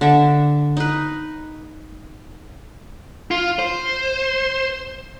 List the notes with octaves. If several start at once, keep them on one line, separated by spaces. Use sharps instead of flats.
D3 E5
D#4 B4
F4
C5